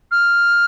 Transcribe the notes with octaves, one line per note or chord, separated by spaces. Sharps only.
F6